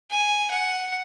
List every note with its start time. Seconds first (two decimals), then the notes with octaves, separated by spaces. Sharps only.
0.10 G#5
0.51 F#5